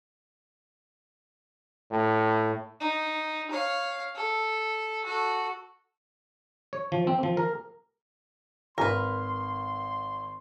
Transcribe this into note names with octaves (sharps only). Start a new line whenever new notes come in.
A2
D#4
C#5 F5
A4
F#4 A4
C#5
F3
C4
F3
A#4
G#1 A#4 B4 C6